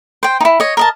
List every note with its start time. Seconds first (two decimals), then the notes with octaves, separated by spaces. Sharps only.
0.23 C5 G5
0.40 D#4 E4
0.60 C#5 D#5
0.77 A#4 D#5 A5